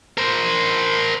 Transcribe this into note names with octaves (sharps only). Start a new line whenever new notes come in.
A#4 C5